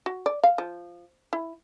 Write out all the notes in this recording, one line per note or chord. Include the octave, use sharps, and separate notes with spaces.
F#4
D5
F5
F3
E4